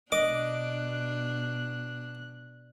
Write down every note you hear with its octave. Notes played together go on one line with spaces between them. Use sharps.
B2 D4 D#5 D6 F#6